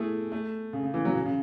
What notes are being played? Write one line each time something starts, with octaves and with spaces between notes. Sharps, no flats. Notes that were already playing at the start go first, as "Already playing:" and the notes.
Already playing: A3 E4 G#4
A3
C#3
C#3
E3
F#3
C#3
C#3